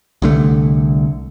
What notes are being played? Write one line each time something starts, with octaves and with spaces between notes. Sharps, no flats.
C2 D3 A3